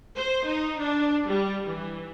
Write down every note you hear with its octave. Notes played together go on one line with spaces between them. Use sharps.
C5
D#4
D4
G3
E3